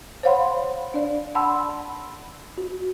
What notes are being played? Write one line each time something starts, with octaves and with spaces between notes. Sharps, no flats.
C5 C#5 F5 F#5 B5 C6
D4 D5
F#5 A5 B5 C6 E6
F#4